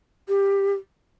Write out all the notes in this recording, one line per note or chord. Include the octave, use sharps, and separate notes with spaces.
G4